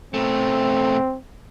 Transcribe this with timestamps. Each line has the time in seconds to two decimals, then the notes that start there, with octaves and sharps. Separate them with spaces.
0.14 B2 A3 C4